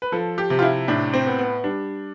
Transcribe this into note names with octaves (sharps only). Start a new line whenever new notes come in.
B4
F3 A4
G4
C3
F4
E4
A2 D4
C4
B3
B3
G3 D4